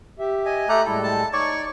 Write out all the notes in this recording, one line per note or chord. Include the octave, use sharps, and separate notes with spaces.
G4 E5
D#5 G#5
A3 G4 A4 A#5 F#6
A2 G3 G#3 E4 A4
A5
D#4 C#5 D5 C#6